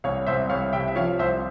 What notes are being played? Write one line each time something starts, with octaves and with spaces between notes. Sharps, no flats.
C2 C#5 F5
C2 C5 E5
C2 C#5 F5
C3 E5 G5
E5
F3 C#5 F5
C2 C5 E5